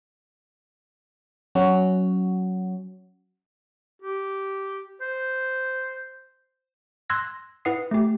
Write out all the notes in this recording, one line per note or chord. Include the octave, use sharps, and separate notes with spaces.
F#3 C#4 F#4
G4
C5
C6 E6 F#6 G#6 A#6
E4 B4 F#5 D#6 C7
A3 G4